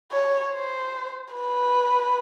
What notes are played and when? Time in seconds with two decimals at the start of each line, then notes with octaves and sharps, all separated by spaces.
0.12 C#5
0.53 C5
1.34 B4